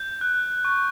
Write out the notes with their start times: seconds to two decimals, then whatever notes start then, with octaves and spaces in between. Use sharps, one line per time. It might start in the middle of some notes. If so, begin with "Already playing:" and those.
Already playing: G6
0.21 F#6
0.65 C#6